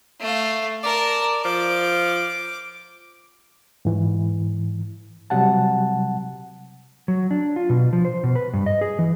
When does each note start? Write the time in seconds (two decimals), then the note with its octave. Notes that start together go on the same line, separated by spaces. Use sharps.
0.20 A3 F5
0.83 A#4 D5 A5
1.45 F3 D6
3.85 G#2 E3
5.30 C3 F#3 G3 F#5 A5
7.08 F#3
7.31 D4
7.56 F4
7.70 B2
7.93 F3
8.05 C5
8.23 B2
8.35 B4
8.53 G2
8.66 D#5
8.81 G#4
8.99 E3